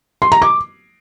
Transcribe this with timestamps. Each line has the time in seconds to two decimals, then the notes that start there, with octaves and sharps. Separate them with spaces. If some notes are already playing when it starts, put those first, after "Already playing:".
0.22 C6
0.32 A#5
0.42 D6